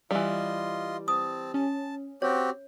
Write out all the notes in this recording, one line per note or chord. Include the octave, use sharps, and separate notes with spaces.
E3 G3 F4 D#5 C6
C4 A5 D#6
C#4 A5
C4 F#4 G4 C#5